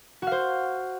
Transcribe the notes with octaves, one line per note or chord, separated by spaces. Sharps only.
F#4 C5 F5